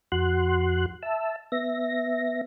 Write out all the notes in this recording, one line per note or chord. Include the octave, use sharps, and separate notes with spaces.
F2 F#4 C6 F#6
E5 A5 E6
B3 E5 A#6